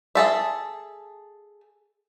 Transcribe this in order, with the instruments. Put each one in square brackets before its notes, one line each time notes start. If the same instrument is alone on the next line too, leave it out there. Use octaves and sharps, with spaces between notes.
[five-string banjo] G#4 A4 E5